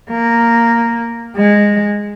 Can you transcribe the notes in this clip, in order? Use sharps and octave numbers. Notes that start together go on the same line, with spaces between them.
A#3
G#3